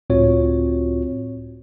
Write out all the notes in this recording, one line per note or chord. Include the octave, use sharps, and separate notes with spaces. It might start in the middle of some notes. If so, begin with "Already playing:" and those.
C#2 A2 C4 F4 F#4 C#5